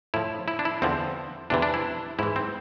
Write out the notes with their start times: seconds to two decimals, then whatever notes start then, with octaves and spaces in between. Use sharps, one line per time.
0.14 A2 F3 E4
0.48 E4
0.59 D4
0.65 E4
0.82 E2 D3 F3 C4
1.50 E2 C3 E3 D4
1.62 D4
1.74 E4
2.19 G#2 E3 E4
2.36 C4